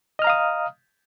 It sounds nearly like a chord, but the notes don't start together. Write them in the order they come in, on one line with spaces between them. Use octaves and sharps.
D#5 F6 A#5 F5 D#6